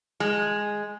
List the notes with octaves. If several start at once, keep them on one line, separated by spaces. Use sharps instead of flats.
G#3